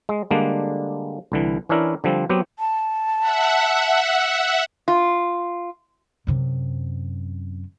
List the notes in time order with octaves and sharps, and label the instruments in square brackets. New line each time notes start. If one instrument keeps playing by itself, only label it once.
[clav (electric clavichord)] G#3
D3 G3 G#3 A#3 D4
C2 D3 E3
E3 C#4 D4 E4 A#4
D3 F3 G3 C4
F#3 B3 C4 G4
[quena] A5
[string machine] E5 F#5
[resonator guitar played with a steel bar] F4
[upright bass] F#2 C3